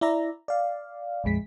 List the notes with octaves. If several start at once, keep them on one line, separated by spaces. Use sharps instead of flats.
E4 D5 E5 A#5
D5 F5
A#1 F2 G#3 B6